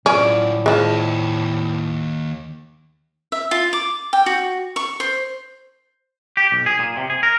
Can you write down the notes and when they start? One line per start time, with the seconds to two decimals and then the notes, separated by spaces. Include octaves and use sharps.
0.06 A2 F#3 C#4 F4 D5
0.66 D#2 F3 G#3 A5
3.32 E5
3.51 F4
3.73 D6
4.13 G5
4.26 F#4
4.76 C#6
5.00 C5
6.37 G4
6.52 B1
6.66 G#4
6.79 A#2
6.97 C3
7.10 G#4
7.23 A#4